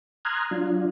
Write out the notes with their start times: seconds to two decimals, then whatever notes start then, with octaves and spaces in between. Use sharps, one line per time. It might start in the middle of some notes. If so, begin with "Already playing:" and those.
0.25 A#5 C6 D#6 F6 F#6 G#6
0.51 F#3 D4 F4